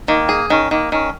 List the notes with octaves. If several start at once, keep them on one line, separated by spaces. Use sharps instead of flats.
D#3 A#3
G#4
D#3 C#4
D#3 A#3
D#3 C#4